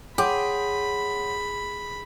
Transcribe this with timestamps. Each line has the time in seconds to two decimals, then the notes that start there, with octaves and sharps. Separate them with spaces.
0.18 G#4 C#5 F#5 G5 B5 C6 D6 G6